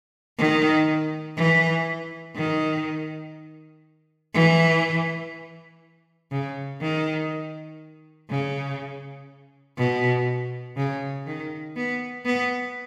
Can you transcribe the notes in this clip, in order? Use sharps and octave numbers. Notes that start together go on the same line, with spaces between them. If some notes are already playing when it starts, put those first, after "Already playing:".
D#3
E3
D#3
E3
C#3
D#3
C#3
B2
C#3
D#3
B3
B3